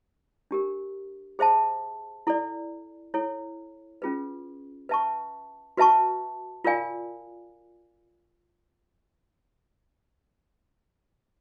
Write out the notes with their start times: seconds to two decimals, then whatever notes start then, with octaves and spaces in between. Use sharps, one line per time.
0.51 D4 G4 A#4
1.39 G#4 C5 E5 A5
2.27 E4 A4 D5
3.14 E4 A4 C#5
4.02 C#4 F4 G#4 B4
4.89 B4 E5 A5 C#6
5.77 F#4 B4 E5 A5 C#6
6.64 F4 A#4 D5 F5 G#5